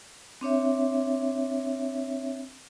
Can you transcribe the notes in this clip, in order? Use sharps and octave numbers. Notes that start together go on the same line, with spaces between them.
C4 D4 C#5 E5